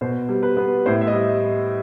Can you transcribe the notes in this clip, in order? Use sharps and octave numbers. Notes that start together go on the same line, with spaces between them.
B2 C5
G3
B4
B3
A2 C5
E5
D#5
G3